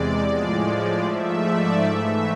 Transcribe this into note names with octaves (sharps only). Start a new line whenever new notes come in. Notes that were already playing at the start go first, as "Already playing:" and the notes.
Already playing: E2 C3 G#3 D5
A2 F3 G#3
G#2 F3 A3 E5
D5
G#2 E3 A3 E5